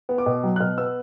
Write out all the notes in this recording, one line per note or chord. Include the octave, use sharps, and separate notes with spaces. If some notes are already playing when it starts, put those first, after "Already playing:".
B3
D6
B2
F#3
F#6
B2 F6
B3 E6